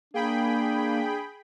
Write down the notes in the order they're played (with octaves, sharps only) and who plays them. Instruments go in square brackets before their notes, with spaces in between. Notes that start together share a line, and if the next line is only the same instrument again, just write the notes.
[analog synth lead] A#3 [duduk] D4 [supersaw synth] G#4 G5 B5